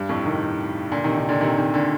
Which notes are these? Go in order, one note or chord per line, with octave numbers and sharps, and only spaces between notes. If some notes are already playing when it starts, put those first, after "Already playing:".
Already playing: G2
F2 A2
C3 D#3
A#2 D3
C3 D#3
C3 D#3
A#2 D3
C3 D#3
C3 D#3
A#2 D3